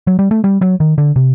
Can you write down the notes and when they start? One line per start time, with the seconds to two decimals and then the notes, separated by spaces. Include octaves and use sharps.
0.07 F#3
0.19 G3
0.31 A3
0.44 G3
0.61 F#3
0.80 D#3
0.98 D3
1.16 C3